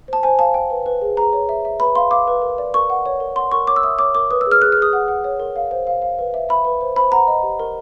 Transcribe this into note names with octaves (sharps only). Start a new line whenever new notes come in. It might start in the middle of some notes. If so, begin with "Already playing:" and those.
C5 A5
C5 G#5
F5 A5
G5
B4
B4
G#4
G#4 A#5
C#5
E5
E5
B4 B5
F5 C6
F5 D6
B4
A#4
D5
A#4 C#6
F#5
C#5
A#4
F#5 C6
A#4 C#6
C#5 D6
E6
E5 D#6
C#5 D6
A#4 D6
B4 D#6
E6
G#4
F6
G#4 F#6
F6
G#4 D#6
F#5
F#5
C#5
A#4
F5
C5
F5
F5
B4
E5
E5 B5
B4
C5
C5 B5
F#5 A#5
D#5
G4
A#4